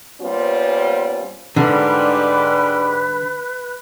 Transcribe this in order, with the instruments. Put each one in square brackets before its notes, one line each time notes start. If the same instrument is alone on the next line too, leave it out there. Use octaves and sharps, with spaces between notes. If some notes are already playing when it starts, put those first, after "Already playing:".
[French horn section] G3 A#3 B3 C#4 F4 C5
[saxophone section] G#2 G3 [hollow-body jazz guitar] D3 [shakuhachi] B4